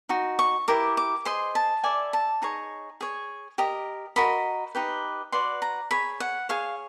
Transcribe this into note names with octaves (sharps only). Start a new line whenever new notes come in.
D#4 F#4
C#6
E4 G4 A#4 D6
D6
G#4 C5 D#5 C6
A5
E4 A4 D5 G#5
A5
D#4 G#4 C#5 A#5
G#4 C#5
G4 A#4 D#5
F#4 A#4 D#5 B5
D#4 G4 B4
F#4 B4 D5 C6
A#5
G#4 C#5 B5
F#5
G#4 C#5 F5